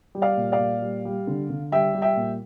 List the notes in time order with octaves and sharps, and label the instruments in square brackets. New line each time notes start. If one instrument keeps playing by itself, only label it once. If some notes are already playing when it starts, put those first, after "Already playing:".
[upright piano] G3
D5 F5
A#2
D5 F5
A#2
G3
G3
D3
D3
G3 E5 G5
G3
E5 G5
A#2